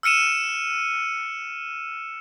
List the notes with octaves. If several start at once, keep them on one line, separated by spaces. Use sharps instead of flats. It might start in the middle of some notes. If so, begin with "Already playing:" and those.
E6 F6 C#7 D#7 E7